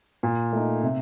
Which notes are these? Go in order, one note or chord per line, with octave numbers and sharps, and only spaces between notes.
A#2
A3 D#4
C3